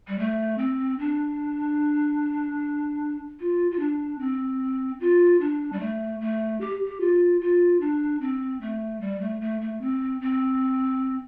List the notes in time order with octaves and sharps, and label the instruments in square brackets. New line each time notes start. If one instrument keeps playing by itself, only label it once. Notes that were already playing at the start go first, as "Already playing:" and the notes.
[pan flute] G3
A3
C4
D4
F4
F4
D4
C4
F4
D4
G3
A3
A3
G4
G4
F4
F4
D4
C4
A3
G3
A3
A3
A3
C4
C4